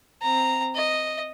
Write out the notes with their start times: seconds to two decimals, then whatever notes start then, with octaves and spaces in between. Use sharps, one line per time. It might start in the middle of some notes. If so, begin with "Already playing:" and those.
0.22 C4 A#5
0.75 D#5